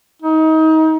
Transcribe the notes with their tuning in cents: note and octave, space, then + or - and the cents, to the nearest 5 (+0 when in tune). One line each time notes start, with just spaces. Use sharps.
D#4 +30